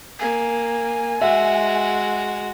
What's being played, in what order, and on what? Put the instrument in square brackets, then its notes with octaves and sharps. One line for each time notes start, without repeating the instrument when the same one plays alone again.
[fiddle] A#3 [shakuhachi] G#5
[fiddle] G#3 F#4 [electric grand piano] E5